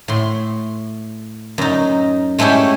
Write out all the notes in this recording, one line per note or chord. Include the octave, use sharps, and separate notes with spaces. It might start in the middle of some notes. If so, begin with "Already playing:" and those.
A2 C6
F#2 D#4
G#3 A3 C#4 E4 G4